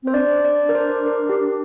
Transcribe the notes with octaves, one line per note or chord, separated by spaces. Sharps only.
C4 C5
D4 D5
D5
A#4
C5
A#4
G4